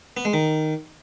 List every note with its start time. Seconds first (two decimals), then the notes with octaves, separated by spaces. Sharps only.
0.17 B3
0.25 G#3
0.33 D#3